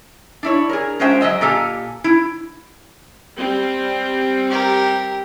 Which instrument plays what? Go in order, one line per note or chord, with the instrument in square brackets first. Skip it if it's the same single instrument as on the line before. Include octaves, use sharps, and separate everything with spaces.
[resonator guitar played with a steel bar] D4 E4 C#5
G#4 A#4
G#3 C#4 F4 C5 E5 G5
F#3 G#4 D#5 E5
A#2 G4 A4 G#5 A#5
E4
[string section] G3 C4
[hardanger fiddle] G4 A#4